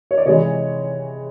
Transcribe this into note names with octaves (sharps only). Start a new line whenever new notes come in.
C#5
D5
C3 E3 G#3 C#5 D#5